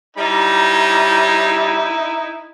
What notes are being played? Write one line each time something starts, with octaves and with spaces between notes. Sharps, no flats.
G3 C#4 D#4 E4 A#5